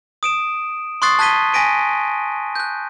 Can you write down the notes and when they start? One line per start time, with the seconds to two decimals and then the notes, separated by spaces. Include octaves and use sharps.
0.23 D#6 D7 E7
1.02 C6 C#6 D#6 F#6 A6 C7
1.19 A5 F#6 G#6 B6 D#7 G7
1.53 G#5 A#6 B6 D7 D#7
2.55 F#6 G6